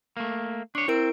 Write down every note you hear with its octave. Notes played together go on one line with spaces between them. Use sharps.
A3 A#3
D4 C#5 C#6
C4 E4 A#4 D7